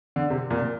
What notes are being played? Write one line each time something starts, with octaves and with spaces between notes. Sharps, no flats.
D3
C3
A#2